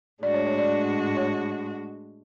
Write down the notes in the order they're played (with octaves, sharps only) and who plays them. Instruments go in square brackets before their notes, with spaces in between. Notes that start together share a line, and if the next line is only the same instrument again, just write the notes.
[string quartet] A2 G#3 D4 F#4 [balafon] D5
[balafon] C#5
C#5
D5
C#5